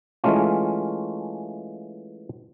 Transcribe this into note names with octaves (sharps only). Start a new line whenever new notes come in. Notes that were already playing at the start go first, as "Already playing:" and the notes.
E3 G#3 A3 C#4 F4